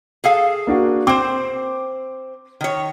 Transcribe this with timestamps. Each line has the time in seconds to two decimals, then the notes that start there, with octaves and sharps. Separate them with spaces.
0.24 G#4 A4 F5
0.67 A#3 D4 F#4
1.07 C4 C5 D6
2.61 D#3 C#5